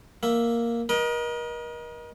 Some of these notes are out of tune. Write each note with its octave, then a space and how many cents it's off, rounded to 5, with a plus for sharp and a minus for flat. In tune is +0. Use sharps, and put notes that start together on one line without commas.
A#3 +0 E5 +0
A#4 +40 D#5 +0